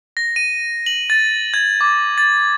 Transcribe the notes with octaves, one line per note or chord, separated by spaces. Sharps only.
A#6
D#7
F#7
A6
G#6
D6
A6